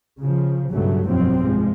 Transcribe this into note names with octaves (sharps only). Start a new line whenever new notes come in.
C#3 F3
B1 G2 C#3 F#3 A3
F1 B1 G2 F3 F#3 C4
F3 G#3